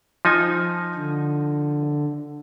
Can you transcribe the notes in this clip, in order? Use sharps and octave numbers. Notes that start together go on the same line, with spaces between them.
F3 D#4 G#5
D3